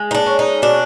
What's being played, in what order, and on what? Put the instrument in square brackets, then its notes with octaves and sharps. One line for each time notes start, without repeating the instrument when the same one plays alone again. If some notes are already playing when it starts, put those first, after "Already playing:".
Already playing: [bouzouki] G#3
D#4
D4
C#4
D#4
B2 D4